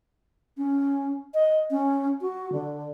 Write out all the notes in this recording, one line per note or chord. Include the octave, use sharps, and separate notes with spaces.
C#4
D#5
C#4
F#4
D3